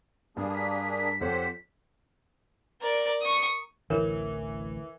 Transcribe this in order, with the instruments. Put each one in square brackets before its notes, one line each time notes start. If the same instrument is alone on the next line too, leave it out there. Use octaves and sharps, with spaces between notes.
[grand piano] G2 [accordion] A#3 D4 G#4
[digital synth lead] B6
[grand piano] F2 A4 C#5 [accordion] G4 C5 F#5
[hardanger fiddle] A#4 D5
C#6 D#6
[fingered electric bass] A1 D2 [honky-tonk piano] E3 [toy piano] A#4 B4 C#5